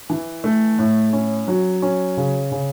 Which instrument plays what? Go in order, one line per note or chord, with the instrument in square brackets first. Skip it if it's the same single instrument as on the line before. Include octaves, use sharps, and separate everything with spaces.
[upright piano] E3
A3
A2
C#4
F#3
C#4
C#3
C#3